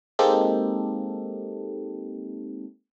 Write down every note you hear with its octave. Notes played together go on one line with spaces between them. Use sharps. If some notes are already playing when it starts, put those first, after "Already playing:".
G#3 A#3 C4 D#4 G4 A4